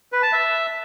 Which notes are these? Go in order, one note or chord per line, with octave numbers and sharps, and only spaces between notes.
B4
A5
E5